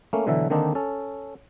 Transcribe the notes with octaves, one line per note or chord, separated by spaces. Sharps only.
A3 A#3 C#4
B2 D3 E3 F#3 E5
D3 D#3 A#3 C4 D4 D#4
C#4 A4